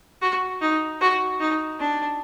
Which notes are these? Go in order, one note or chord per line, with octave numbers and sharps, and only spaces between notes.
F#4
D#4
F#4
D#4
D4